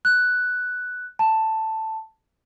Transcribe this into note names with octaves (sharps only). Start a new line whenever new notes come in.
F#6
A5